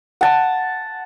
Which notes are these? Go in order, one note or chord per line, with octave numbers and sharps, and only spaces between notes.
F#5 A5